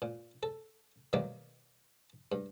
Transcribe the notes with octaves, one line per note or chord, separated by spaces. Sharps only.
A#2
A4
B2 D#3 F#3 G3 A#3
G2